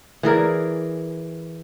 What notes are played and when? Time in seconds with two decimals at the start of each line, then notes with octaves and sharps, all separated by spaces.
0.23 E3 G#4 A#4 D5